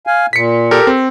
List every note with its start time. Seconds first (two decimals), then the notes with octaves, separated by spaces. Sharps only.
0.07 F5 G#5
0.33 A#2 B6 C#7
0.71 G4 A4 A#4
0.87 C4